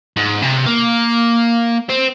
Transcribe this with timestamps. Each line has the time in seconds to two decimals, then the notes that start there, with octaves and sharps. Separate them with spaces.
0.17 G#2
0.42 C3
0.66 A#3
1.90 C4